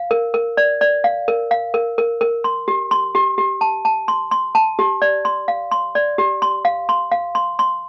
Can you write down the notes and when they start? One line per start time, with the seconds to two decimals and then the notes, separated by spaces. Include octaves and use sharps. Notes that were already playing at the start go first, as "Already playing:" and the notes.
Already playing: F5
0.11 A#4
0.34 A#4
0.57 D5
0.81 D5
1.04 F5
1.28 A#4
1.51 F5
1.74 A#4
1.98 A#4
2.21 A#4
2.44 C6
2.68 G4
2.91 C6
3.15 G4
3.38 G4
3.61 A5
3.85 A5
4.08 C6
4.31 C6
4.55 A5
4.79 G4
5.02 D5
5.25 C6
5.48 F5
5.72 C6
5.95 D5
6.18 G4
6.42 C6
6.65 F5
6.89 C6
7.11 F5
7.35 C6
7.59 C6